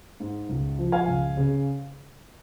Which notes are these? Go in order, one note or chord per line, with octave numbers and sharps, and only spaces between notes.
G#2
C#2
F3
F5 G#5
C#2
C#3